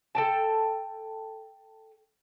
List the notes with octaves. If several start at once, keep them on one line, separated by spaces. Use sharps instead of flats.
A4 G5 A5